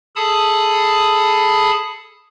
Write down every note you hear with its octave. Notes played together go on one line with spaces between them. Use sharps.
G#4 A4 A5 B5 D#6